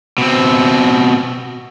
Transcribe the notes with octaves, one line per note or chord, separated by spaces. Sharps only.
B2 C4